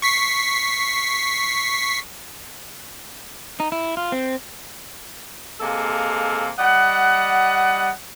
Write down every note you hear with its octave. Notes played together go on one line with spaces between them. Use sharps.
C#6 B6 C7
D#4
E4
F4
C4
C3 G#3 A#3 A4 F5
G3 D#5 F#5